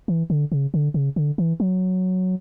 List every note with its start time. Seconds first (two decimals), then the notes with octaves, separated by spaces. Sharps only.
0.08 E3
0.30 D3
0.52 C#3
0.74 D3
0.94 C#3
1.16 D3
1.38 E3
1.60 F#3